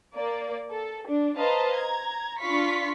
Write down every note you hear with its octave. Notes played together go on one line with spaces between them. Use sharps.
A#3 D5
A4
D4
B4 C5 D#5 F5 A5 A#5
A#5 G#6
D4 F4 F5 B5 C#6 B6